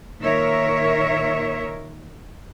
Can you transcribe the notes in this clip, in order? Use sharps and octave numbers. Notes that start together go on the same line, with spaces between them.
A#2 D#3 A#4 C#5 E5